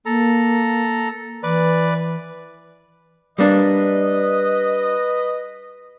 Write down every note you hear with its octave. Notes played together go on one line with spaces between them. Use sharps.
A#3 A4 A#5
E3 B4 D5
G3 A#3 D4 B4 D#5